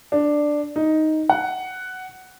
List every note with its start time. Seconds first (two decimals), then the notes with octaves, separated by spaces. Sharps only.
0.12 D4
0.76 D#4
1.29 F#5